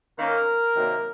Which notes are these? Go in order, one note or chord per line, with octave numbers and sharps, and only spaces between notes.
D#3 A#3 C#4 A#4
C3 D#3 F#3 A#3